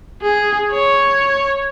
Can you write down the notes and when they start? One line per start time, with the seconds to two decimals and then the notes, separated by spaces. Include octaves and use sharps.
0.22 G#4
0.71 C#5